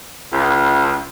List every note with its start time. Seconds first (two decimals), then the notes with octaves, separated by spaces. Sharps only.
0.33 C#2